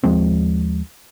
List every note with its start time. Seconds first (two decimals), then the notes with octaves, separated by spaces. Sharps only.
0.03 D#2 F3 G#3 C4